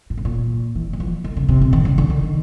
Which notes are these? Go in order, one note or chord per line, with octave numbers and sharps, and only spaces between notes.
A#2
A2
A#2
E3
E3
F3
D#3
C#3
C3
A#2
D#3
C#3
D3
D#3